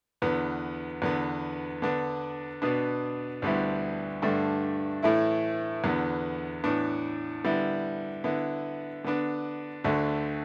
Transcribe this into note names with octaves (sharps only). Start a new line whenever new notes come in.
E2 D3 B3
E2 D3 B3
D3 B3 D4
B2 B3 D4
D2 D3 G3 B3 E4
G2 D3 A3 D4
A2 E3 A3 E4
E2 D3 B3
A2 E3 B3 D4
D3 G3 B3 E4
D3 B3 E4
D3 B3 D4
D2 D3 A3